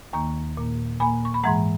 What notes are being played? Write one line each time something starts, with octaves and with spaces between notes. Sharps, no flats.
D#2 D#3 A#3 A#5 C#6
A#2 A#3
A#2 A#3 G#5 B5
C#6
B5
G#2 E3 G#3 F#5 A#5